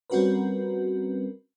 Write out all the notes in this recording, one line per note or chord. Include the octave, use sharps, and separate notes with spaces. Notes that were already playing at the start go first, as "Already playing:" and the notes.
G3 C4 C#4 F#4 A#4 B4